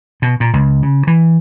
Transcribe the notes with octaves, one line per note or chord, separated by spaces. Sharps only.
B2
A#2
C#2
C#3
E3